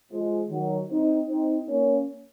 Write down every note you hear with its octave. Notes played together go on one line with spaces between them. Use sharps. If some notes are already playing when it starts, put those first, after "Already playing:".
F3 G#3
D#3 F#3
C4 D#4
C4 D#4
A#3 C#4